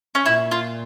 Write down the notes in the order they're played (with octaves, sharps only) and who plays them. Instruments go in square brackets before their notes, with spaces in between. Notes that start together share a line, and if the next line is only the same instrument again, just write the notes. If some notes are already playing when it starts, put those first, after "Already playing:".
[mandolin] C#4
[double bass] A#2 [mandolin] E4
[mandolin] F4